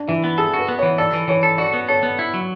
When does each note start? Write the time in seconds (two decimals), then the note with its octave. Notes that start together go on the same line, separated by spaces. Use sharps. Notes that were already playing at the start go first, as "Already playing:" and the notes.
Already playing: D4
0.08 E3 E4
0.24 B3
0.38 G#4 A4
0.53 F#4
0.59 B4
0.68 B3
0.79 E3 C#5
0.98 A4 D5
1.13 E3
1.28 E3 C#5
1.43 A4
1.58 F#4 D5
1.73 B3
1.88 A4 C#5
2.03 B3
2.19 E4
2.34 F#3